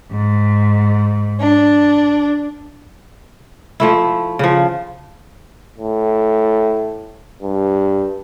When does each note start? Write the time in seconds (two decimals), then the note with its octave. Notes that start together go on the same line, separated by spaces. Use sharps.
0.11 G#2
1.41 D4
3.80 F3 A3 E4
4.39 C#3 F3
5.78 A2
7.42 G2